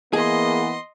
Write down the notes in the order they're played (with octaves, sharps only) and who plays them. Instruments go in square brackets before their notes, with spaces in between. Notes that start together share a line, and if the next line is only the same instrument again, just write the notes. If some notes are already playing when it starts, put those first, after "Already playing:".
[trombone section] E3 A#3 B3 [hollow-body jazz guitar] G#4 [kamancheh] D#5 C6